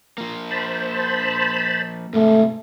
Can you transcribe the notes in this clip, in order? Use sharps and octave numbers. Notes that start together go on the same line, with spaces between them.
F3 A#3
C5 A5 B5
G#2 C3 A3